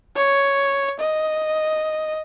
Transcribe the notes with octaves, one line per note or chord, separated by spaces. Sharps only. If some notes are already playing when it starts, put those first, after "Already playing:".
C#5
D#5